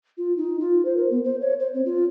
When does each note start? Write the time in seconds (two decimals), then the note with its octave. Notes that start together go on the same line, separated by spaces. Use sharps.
0.18 F4
0.37 D#4
0.60 F4
0.85 C5
0.97 A#4
1.11 B3
1.24 C5
1.41 C#5
1.60 C5
1.74 C4
1.85 F4